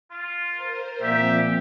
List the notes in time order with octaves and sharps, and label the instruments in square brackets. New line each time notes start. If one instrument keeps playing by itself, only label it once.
[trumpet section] F4
[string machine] A#4 C5
[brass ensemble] A#2 [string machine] F3 C4 [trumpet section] G4 [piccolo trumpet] E5